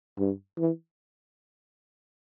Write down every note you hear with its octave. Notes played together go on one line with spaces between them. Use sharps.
G2
E3